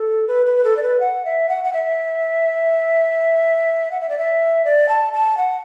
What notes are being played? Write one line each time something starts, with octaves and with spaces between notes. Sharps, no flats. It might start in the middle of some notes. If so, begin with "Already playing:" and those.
Already playing: A4
B4
B4
A4
D5
B4
F#5
E5
F#5
F#5
E5
F#5
E5
D5
E5
D5
A5
A5
F#5